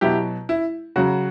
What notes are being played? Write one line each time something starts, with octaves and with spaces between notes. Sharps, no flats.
B2 F#3 E4 G4
E4
C#3 F#3 F#4